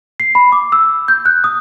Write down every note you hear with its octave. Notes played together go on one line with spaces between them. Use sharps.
C7
B5
D6
E6
G6
F#6
D#6